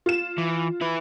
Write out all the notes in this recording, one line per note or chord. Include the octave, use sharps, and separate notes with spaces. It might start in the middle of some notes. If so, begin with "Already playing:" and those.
F4 E7
E3
E4 B4